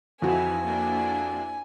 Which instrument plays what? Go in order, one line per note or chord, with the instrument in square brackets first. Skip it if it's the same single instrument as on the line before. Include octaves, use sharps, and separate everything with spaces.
[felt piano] F2 F#4 [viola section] E3 D#4 E4 [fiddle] G#5
[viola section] A#3 D4 E4